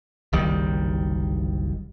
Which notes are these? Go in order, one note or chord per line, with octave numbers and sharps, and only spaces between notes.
F#1 C2 D#3 G3